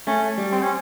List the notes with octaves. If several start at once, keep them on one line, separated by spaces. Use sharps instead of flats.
A3 C#4
G3
C4
C#4